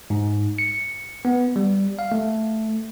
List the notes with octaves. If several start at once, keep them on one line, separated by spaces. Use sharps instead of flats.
G#2
C#7
B3
G3
F5
A3